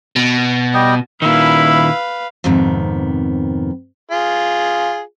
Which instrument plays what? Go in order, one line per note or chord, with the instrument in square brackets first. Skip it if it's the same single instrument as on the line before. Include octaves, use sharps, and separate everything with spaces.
[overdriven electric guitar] B2
[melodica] G3 D#5 G5
[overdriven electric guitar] A#2 D#3 [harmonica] E4 E6 [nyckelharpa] B4 F5
[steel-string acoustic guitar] F2 G#2 C3 D#3 B3
[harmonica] F4 G#4